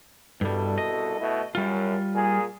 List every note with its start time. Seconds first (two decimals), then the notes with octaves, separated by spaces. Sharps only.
0.41 C2 G2 B2 G3 A4
0.78 D#5
1.20 B2 A3 E4
1.55 F#2 G3 F4
2.14 A#2 G#4